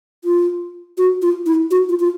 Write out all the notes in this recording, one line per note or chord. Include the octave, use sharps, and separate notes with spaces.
F4
F#4
F4
E4
F#4
F4
F4